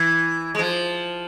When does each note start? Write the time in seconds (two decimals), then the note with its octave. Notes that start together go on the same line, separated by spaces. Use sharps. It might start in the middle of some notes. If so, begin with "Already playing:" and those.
Already playing: E3
0.55 G#3
0.59 F3